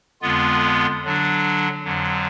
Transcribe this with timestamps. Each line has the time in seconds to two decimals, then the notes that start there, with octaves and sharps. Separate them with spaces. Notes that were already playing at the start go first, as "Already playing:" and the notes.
0.21 F2 D3 G#3 B3 F4
1.04 D3 F#3 D4
1.84 F2 D3 F#3